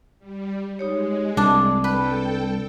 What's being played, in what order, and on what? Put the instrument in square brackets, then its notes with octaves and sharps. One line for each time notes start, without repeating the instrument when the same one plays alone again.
[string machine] G3
[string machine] G#3 [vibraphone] D#4 G4 C#5
[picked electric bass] C2 [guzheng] D4 [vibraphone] A5
[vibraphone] G3 [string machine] A4 G5 [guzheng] B4